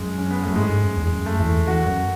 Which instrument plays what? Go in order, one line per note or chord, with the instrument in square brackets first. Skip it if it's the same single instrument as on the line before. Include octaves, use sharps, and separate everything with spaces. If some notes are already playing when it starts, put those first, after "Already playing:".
Already playing: [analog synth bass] F#2 [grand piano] G#3
[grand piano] C#4
B3
A3
[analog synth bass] F#2
[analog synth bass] G#2 [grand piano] G#3
[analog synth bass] G#2
F#2
E2
F#2
[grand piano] A3
[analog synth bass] E2 [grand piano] A3
[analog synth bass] E2 [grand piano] F#4
[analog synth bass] F#2